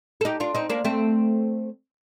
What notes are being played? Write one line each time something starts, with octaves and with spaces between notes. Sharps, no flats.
A4
D#4 G4
D4 F4
C4 D#4
A#3 D4
A3 C4